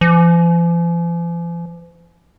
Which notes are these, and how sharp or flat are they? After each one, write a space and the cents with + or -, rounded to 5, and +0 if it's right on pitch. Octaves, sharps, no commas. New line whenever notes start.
F3 -45